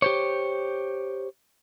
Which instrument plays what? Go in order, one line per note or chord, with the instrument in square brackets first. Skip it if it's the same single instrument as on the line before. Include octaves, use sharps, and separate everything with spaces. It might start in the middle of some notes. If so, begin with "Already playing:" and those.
[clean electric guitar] G4 C5 C#5